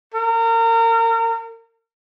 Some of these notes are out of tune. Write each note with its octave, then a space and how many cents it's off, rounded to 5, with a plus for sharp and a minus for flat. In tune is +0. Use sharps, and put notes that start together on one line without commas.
A#4 -30